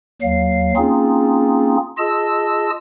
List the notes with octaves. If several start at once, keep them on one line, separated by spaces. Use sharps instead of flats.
D#2 F#3 F5
A#3 C4 C#4 D#4 F4 G#4
F4 G#4 D#5 A5 E6